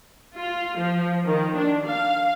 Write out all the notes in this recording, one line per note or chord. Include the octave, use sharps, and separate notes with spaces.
F4
F3
D#3
D4
F5